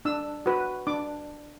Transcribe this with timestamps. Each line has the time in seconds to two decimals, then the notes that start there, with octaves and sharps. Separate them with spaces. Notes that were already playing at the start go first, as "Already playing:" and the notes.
0.05 D4 E6
0.46 F#4 B4
0.87 D4 D6